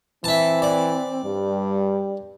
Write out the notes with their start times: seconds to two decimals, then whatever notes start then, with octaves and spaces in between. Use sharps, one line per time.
0.24 E3 C4 E5 A5
0.62 D5
1.25 G2 G3